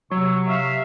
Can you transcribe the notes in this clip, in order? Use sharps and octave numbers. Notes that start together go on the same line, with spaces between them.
C3 F#3 C#6 E6
E5 F5